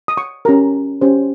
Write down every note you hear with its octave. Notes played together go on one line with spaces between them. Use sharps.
D#6
C#6
C#4 G4 A#4 A#5
C#4 G4 C5